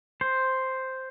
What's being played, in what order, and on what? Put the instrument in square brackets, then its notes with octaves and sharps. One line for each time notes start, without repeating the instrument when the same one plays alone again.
[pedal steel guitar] C5